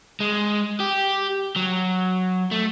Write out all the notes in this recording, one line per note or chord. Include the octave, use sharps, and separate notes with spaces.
G#3
G4
F#3
A3